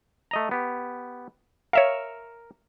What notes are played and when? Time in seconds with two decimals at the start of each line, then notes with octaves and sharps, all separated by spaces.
0.31 A3 D#5 A#5
0.51 B3 G4
1.73 A#4 C#5 E5 F5